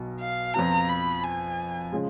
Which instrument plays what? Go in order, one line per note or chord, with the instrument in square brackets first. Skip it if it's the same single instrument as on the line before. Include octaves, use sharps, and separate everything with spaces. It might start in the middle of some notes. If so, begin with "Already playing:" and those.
Already playing: [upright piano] B1 B2
[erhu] F5
[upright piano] F2 F3 B3 F4 [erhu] A#5
[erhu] B5
G#5
[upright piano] C#3 F3 G#3